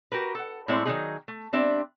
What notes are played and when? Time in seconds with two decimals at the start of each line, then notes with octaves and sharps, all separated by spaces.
0.12 F#4 G4 A#4 B4
0.35 A4 F#5
0.68 A2 G#3 C4 E4 C#5 D5
0.85 D#3 F#3 G#3 C#4 D#4 G#4
1.28 A3
1.53 G3 C4 D4 E5